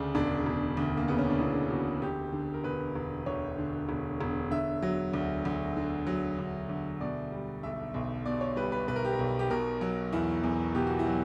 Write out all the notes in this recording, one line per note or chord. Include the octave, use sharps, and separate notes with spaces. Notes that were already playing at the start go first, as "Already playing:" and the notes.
Already playing: D2 C#3 D4
E1 D4
E1
D2
A#3
C#3 B3
C#4
D4
E1 E4
E1 F#4
D2 G4
D3
A#4
E1 B4
E1
D2 C#5
D3
E1
E1
D3 E5
F#3
D2
D2
D3
F#3
D2
D2
B2 D5
G3
B1 E5
B1
B2 D5
C#5
G3 B4
B4
B1 B4
A#4
G4
A#4
B1
G4
B2 A#4
F#3
E2 E4
E2
B2 G4
F#4
E4
F#3